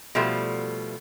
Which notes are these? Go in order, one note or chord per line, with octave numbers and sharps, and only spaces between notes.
B2 F3 G3 A3